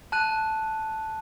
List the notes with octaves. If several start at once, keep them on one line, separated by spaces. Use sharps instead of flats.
A5 F#6 D#7